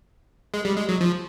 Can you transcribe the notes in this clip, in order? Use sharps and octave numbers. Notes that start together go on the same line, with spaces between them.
G#3
G3
G#3
F#3
F3